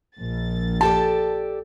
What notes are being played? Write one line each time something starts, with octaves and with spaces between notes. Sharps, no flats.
A#1 A6
G4 A4 D5 A5